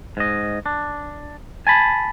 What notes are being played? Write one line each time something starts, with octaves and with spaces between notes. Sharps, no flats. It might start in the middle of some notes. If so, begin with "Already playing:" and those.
G#2 D#5
D4
G#5 A5 B5